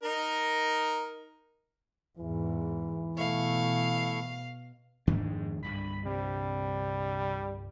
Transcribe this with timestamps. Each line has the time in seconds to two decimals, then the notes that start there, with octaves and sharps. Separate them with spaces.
0.03 D#4 A#4
2.18 E2 G#2 E3
3.17 B2 A3 E4 F5 C#6
5.07 F2 G#2 D#3 D4
5.63 C2 G2 D3 B5
6.06 C3 G3